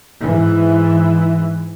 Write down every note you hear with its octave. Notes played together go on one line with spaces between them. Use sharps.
G#2 E3